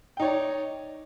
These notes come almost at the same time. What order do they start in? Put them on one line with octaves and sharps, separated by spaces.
G5 D#4 C#5 D5